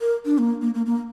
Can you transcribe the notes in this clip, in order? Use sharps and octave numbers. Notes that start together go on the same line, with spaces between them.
A#4
D4
A#3
A#3
A#3
A#3